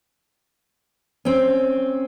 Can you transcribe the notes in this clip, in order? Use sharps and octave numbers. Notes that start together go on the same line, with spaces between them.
C4 C#4